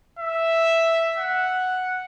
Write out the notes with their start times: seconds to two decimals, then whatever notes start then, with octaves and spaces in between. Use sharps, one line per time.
0.19 E5
1.17 F#5